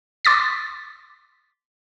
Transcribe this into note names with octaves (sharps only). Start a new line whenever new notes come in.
C6 D6 A6 B6